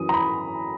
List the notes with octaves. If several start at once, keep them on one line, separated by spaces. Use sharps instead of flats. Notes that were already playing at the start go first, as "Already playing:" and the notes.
Already playing: F#2 E3 D#6
A#5
B5